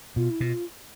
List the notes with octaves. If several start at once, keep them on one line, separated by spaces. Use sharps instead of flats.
B2 F4
E4
B2 F4